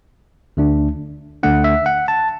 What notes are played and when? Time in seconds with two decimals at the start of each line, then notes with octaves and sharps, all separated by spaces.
0.57 D2 D3 A3 D4
1.43 D2 D3 A3 D4 F#5
1.64 E5
1.86 F#5
2.08 A5